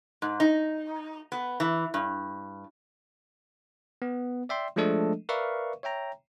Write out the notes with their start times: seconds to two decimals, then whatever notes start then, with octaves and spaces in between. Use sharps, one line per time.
0.22 G#2
0.40 D#4
1.32 B3
1.60 E3
1.94 G2
4.02 B3
4.49 D5 E5 G5 C6
4.76 F3 G#3 A3 D4 A4 D#5
5.29 A#4 B4 D5 E5 F5 C#6
5.83 C#5 E5 G5 A#5